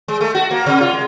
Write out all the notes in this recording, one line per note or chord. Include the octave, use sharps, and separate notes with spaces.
G#3
A3
F#4
A#3
C3
F4
G#3